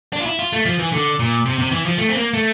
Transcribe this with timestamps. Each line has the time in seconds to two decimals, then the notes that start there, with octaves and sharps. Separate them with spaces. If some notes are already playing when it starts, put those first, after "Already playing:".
0.13 D4
0.20 F4
0.26 E4
0.39 F4
0.53 A3
0.66 F3
0.79 E3
0.93 D3
1.19 A#2
1.46 C3
1.59 C3
1.72 E3
1.85 F3
1.98 A3
2.09 C4
2.16 A#3
2.34 A3